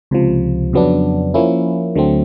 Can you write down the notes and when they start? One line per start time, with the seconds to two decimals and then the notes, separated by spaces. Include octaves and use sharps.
0.11 C#2 C3 F3
0.73 F2 C#3 F#3 B3 D4
1.34 F3 A#3 C#4 E4
1.95 D2 D3 F#3 A3 C4